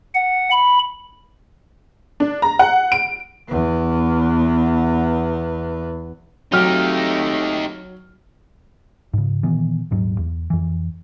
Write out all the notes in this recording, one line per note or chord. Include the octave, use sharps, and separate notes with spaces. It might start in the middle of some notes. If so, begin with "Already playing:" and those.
F#5
B5
D4
A#5
F#5
D7
E2 B3
F#3 A3 C4 D#4 G4 F6
G#2 C#3
A#2 D#3 E3 B3
D#1 G#2 F#3
E2
F2 E3